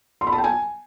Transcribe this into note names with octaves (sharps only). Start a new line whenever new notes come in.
C6
B5
A5
G5
G#5